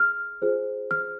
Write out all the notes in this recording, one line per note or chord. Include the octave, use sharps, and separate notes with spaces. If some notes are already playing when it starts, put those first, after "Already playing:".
Already playing: G#4 F6
F4 G#4 C5
F6